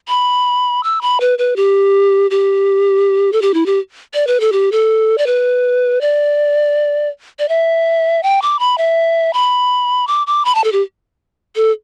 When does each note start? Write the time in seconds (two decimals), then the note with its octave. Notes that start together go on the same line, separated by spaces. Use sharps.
0.08 B5
0.84 E6
1.02 B5
1.21 B4
1.38 B4
1.56 G4
2.31 G4
3.33 A4
3.42 G4
3.54 E4
3.66 G4
4.14 D5
4.27 B4
4.40 A4
4.52 G4
4.72 A4
5.18 D5
5.27 B4
6.01 D5
7.39 D5
7.49 E5
8.23 G5
8.42 D6
8.59 B5
8.78 E5
9.34 B5
10.08 D6
10.27 D6
10.45 B5
10.55 A5
10.64 A4
10.72 G4
11.56 A4